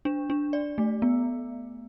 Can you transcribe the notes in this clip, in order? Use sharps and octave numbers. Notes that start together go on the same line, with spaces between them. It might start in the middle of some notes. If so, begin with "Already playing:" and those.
D4
D4
D5
A3
B3